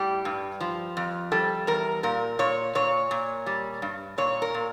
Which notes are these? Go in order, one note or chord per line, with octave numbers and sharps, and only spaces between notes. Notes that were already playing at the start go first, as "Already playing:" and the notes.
Already playing: A2 G3 G4
G2
F3
F2
G3 A4
E2 A#4
A#2 A#4
A#2 C#5
A#2 C#5
A#2
G3
G2
A#2 C#5
A#4
A#2